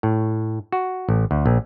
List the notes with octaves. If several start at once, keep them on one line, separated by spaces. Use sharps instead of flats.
A2
F#4
A1
D2
A#1